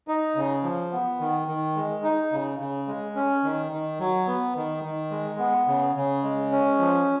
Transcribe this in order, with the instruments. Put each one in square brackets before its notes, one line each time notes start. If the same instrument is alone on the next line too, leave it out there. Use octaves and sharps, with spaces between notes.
[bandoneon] D#4
C#3
F3
B3
D#3
D#3
G#3
D#4
C#3
C#3
G#3
C#4
D#3
D#3
F#3
B3
D#3
D#3
G#3
B3
C#3
C#3
G#3
C#4
F3